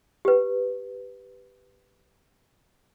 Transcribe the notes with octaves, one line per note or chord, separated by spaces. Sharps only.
G4 B4